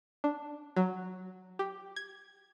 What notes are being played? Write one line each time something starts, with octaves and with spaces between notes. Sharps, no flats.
D4
F#3
G4
G#6